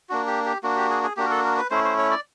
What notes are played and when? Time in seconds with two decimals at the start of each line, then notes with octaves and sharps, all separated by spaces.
0.09 A#3 D4 F#4
0.27 G4
0.45 G4
0.63 A#3 D4 F#4
0.77 G4
0.91 G#4
1.04 G#4
1.17 A#3 D4 F#4 G4
1.26 A#4
1.31 A4
1.44 A#4
1.58 B4
1.70 A3 C#4 E4 C5
1.84 C5
1.98 C#5
2.11 D5